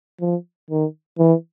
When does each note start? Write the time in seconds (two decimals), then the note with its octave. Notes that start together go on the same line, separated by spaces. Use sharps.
0.21 F3
0.70 D#3
1.19 E3